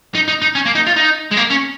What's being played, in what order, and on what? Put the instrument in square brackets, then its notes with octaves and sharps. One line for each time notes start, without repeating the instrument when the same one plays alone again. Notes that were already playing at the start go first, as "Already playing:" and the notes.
[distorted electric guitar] D#4
D#4
D#4
C#4
A#3
D#4
F4
D#4
G#3
A#3
C#4